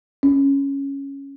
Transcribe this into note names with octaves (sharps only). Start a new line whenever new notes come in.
C#4